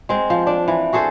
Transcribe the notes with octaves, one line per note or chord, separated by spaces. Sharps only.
G#3 C4
F3
D4
E3
F#4 G#4 A4 C5